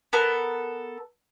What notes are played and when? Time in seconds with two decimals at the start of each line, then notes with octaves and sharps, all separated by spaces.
0.13 B3 A4 A#4